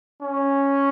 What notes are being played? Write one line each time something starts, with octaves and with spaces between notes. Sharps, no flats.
C#4